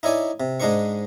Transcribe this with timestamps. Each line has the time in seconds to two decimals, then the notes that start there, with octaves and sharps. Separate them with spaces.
0.03 D#4 E4 C#5 D5 G#5
0.40 C3
0.60 G#2 G#3 D4 D#4 C5 C#6